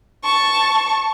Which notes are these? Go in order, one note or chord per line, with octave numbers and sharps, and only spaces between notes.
A5 C#6